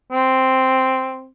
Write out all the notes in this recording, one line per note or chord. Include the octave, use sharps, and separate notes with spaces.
C4